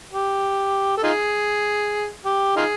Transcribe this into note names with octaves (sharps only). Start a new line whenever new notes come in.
G4
A4
D#4 F4 G#4
G4
D#4 F4 G#4